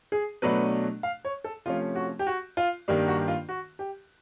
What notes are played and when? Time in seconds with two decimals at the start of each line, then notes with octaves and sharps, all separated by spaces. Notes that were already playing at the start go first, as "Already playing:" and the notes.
0.12 G#4
0.42 B2 F#3 A3 D4 B4
1.03 F5
1.25 C#5
1.44 A4
1.65 C3 F3 A3 C#4 F4
1.95 F#4
2.19 G4
2.27 F#4
2.57 F4
2.88 G2 D#3 G3 A#3 D4
3.08 F#4
3.28 F4
3.49 F#4
3.79 G4